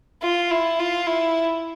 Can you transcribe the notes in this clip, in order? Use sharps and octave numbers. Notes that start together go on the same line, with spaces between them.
F4
E4
F4
E4